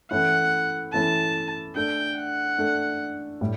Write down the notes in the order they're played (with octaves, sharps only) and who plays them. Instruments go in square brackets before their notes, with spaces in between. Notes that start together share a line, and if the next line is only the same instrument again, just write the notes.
[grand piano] E3 A3 C#4 E4 [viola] F#5
[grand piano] E3 A3 C#4 E4 [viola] A5
[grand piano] A3 D4 A4 [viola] G5
[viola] F#5
[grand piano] A3 D4 A4
A2 G3